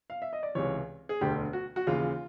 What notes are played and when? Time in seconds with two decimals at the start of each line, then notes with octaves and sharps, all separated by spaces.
0.10 F5
0.22 E5
0.33 D#5
0.43 D5
0.55 C#2 C3 E3 C#5
1.09 G#4
1.21 E1 D2 D3 G4
1.53 F#4
1.76 F#4
1.87 D#2 C#3 E3 F4